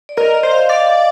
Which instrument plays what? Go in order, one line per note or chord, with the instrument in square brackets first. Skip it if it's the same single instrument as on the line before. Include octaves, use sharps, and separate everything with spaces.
[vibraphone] D5
[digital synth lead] A#4 [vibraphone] D#5
[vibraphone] D#5
[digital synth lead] C5
[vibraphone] F5
[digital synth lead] D5 [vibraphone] F5